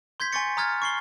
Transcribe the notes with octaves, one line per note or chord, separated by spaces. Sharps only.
C6 G6 G#6 B6
G#5 C6 C#6 A6 C#7
A#5 D#6 F6 G#6 A6
C#6 C7 G7